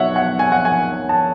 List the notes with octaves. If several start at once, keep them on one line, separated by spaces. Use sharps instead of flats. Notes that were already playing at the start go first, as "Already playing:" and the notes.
Already playing: B2 F#3 C#5 E5 F#5
F#5
G#5
F#5
G#5
A5